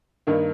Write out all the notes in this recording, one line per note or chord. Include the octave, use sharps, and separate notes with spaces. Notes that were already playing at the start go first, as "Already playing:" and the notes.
G2 D#3 A#3